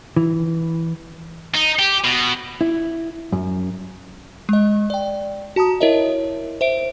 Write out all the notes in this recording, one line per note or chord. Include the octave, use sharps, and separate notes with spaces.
E3
D#4
G4
B2
E4
F#2
G#3 D#5
D5 G5
F#4 A5 A#5 D#6
E4 A#4 C#5 D#5 E5
C5 E5 D7